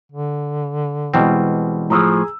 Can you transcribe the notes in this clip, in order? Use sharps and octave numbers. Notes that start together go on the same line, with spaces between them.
D3
B2 E3 G3 G#3 C4
A2 F3 G#4 A#5 D#6 E6